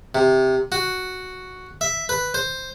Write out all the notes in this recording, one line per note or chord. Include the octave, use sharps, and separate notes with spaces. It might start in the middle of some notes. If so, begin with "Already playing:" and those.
C3
F#4
E5
B4
C5